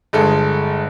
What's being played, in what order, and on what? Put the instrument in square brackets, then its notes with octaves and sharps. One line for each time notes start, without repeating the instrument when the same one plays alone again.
[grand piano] G1 G#3 A4